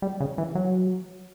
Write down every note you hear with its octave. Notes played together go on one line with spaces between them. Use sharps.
G3
C#3
E3
F#3